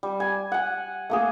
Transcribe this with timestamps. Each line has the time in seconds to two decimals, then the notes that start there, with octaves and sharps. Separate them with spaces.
0.03 G3
0.20 G#5
0.52 F#5 G#5
1.10 A3 A#3 G#4